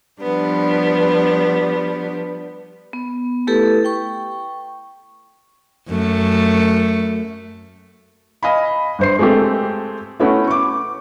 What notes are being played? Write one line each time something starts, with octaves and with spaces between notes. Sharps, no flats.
F3 G3 B3 D4
B3
A3 E4 G4 A4 B4
G5 C#6
F#2 A3
D#5 F5 G#5 B5
G1 C5 C7
G#3 A3 C4 G4 A4
A3 B3 C#4 E4 F#4
C#6 D6